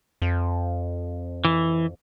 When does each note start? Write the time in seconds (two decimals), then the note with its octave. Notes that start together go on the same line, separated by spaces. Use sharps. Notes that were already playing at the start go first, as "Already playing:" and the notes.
0.22 F2
1.45 E3